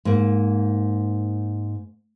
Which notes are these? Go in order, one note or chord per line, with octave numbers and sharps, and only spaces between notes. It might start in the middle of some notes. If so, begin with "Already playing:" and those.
G#2 A#3